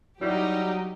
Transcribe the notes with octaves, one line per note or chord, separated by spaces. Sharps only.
F#3 G3 D#4 E4 F#4 G4